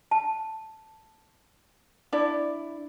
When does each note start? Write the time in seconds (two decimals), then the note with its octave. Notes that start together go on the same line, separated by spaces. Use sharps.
0.11 A5
2.12 D4 E4 D5